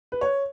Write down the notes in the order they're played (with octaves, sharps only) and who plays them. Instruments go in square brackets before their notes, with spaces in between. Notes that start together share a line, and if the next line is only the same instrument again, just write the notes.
[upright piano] B4
C#5